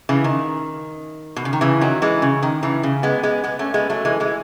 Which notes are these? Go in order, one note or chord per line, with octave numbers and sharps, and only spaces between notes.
C#3 E3
D#3
B2
C#3
D#3
C#3 E3
D#3 F#3
E3 G#3
C#3
D#3
C#3 E3
C#3
G#3 B3
G#3 B3
G#3 B3
A3 C#4
G#3 B3
F#3 A3
E3 G#3
E3 G#3